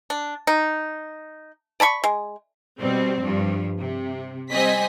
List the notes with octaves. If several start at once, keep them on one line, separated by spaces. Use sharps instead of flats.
D4
D#4
D5 A5 B5 C#6
G#3
B2 G3 C4
G2 F3
C3
G3 C4 D#5 G#5 B6